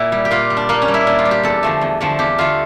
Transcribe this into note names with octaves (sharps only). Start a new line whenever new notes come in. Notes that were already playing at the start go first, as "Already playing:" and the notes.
Already playing: A#2 E4
G3
G4
A#2 F4
G3
D4
A#2 A#3
C#4
G3
E4
A#2 D4
F4
G3
G4
E2 A4
D3 F3 A3
E2
D3 F3 A3
E2 G4
D3 A3 F4